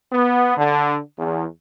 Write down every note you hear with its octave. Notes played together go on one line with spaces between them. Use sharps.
B3
D3
E2